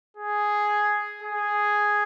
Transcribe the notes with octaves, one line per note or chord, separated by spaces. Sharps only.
G#4
G#4